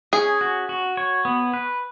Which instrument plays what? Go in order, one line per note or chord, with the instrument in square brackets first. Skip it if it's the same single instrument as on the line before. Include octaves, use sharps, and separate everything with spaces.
[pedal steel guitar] C#4 [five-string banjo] G#4
[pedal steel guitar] F#4
F#4
C#5
B3
B4